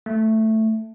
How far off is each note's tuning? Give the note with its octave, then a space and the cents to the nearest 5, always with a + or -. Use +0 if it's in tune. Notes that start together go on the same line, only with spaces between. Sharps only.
A3 +5